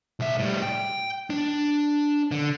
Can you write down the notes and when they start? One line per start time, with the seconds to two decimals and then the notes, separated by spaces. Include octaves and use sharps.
0.20 B1 E5
0.39 A2 G3
0.62 G5
1.30 D4
2.31 D3